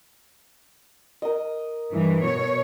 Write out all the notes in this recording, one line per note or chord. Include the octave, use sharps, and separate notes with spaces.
A#4 D#5
G2 E3
B2 C#5